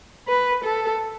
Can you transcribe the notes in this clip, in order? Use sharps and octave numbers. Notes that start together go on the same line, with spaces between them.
B4
A4